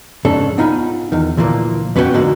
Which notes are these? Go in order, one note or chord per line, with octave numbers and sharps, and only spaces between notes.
F2 G#2 C#3 D4 A4
B3 D#4 F4 F#5 G#5 B5
E2 D#3
D2 A#2 E3 F3 G#3 A#3
F2 B3 C#4 F4 F#4 G5
G#2 D3 G#3 A#3 F#4